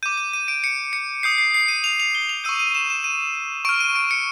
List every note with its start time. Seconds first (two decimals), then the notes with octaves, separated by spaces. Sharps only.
0.03 D6 G6 D#7
0.18 D#7
0.33 D#7
0.48 D7
0.64 C#7
0.93 C#7
1.23 D#6 G6 C7
1.38 C7
1.54 C7
1.68 D#7
1.84 F7
2.00 F7
2.15 G7
2.29 F7
2.44 C#6 E6 G6 D#7
2.59 D#7
2.75 E7
2.90 E7
3.04 D#7
3.65 C#6 F6 D7
3.80 D#7
3.96 D7
4.11 C#7